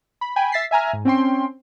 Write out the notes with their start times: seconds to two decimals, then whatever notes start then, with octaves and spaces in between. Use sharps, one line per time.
0.21 B5
0.36 G5 G#5 B5
0.52 E5 A6 B6 C7
0.71 E5 G#5 A#5 F6
0.93 G#2
1.05 C4 C#4 G5 C6